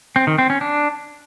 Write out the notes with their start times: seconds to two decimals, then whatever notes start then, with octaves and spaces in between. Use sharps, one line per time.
0.16 C4
0.27 D#3
0.38 C4
0.50 C#4
0.61 D4